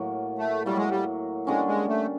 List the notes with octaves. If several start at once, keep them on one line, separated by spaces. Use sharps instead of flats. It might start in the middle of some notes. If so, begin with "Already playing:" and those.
Already playing: A2 F#3 A#3
A3
A2 F#3 G3 A#3
G#3
G3
D3 G3 G#3 A#3 C#4
G#3
A3